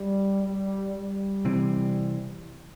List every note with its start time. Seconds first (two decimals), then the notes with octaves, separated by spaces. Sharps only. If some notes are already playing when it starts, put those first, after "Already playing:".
Already playing: G3
0.43 G3
0.94 G3
1.45 C3 E3 C4